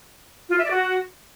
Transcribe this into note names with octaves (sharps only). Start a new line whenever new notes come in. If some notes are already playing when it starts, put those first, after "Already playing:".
F4
E5
D5
F#4